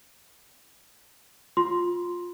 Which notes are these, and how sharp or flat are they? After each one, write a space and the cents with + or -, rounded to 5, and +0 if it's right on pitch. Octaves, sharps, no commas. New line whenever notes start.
F4 +15 C6 +0